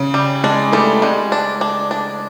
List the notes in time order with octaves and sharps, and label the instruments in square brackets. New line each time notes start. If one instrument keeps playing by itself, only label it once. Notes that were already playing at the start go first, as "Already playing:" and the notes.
Already playing: [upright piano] C#3
[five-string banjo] G3
[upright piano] G#3 [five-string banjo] D4
[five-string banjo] G3 [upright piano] A3
[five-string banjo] G3 [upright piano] G#3
[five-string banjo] D4
D4
D4